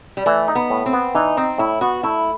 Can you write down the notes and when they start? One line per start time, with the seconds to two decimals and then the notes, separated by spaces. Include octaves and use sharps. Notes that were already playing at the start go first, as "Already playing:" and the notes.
0.17 G3
0.26 E3 A3
0.48 D#4
0.55 B3
0.70 A2
0.86 C4
0.93 B3
1.15 E3 D#4
1.37 C4 D#4
1.58 A2 E4
1.81 B3 F#4
2.03 A3 E4